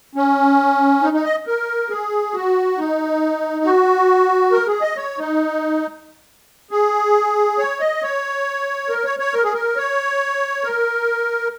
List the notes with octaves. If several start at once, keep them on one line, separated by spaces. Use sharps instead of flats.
C#4
D#4
D#4
D#5
A#4
G#4
F#4
D#4
F#4
A#4
G#4
D#5
C#5
D#4
G#4
C#5
D#5
C#5
A#4
C#5
C#5
A#4
G#4
A#4
C#5
A#4